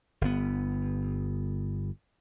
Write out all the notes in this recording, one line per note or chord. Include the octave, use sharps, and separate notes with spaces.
G1 B3